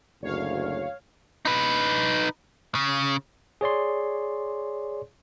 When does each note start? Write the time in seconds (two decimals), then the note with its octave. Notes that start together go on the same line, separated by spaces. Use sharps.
0.23 F#1 D2 C#5 F5
1.45 D#4 B4
2.75 C#3
3.61 G#4 C#5 D5 C6